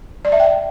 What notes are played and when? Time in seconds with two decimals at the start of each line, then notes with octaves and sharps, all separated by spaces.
0.25 D5
0.32 E5
0.40 G5